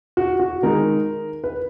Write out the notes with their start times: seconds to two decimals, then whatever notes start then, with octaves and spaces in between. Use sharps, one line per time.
0.17 F#4
0.40 F#4
0.62 D#3 G#3 D#4 A#4
1.44 B4